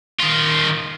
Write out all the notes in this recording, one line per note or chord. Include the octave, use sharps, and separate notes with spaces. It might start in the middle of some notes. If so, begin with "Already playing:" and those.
D#3 F4